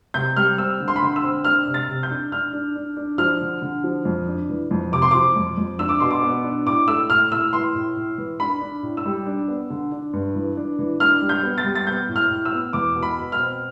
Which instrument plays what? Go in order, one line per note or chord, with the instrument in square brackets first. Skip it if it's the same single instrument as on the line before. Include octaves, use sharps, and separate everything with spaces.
[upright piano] C3 G6
G3 F6
C4 E6
D3
C6
B5
D3 C6
E6
C4
D4 F6
C3
A6
C3
G6
D4
D4 F6
D4
D4
D4
F3 F6
D3
D3
F3
F2
D4
E3
F2
C3 D6
C6
F3 D6
F2
F2
D4 E6
D6
B2 C6
D6
B3
D4
A2 D6
A3 E6
A2 F6
A2 E6
E3 C6
A2
A2
E3
D4 B5
D4
A2
E6
G3
D4
B3
D3
D4
G2
E3
D4
E3
D4 F6
G3
G6
B3
A6
G3
A6
B3 G6
A2
F6
A2
E6
B3
E2 D6
B2
B5
B2
F6
C4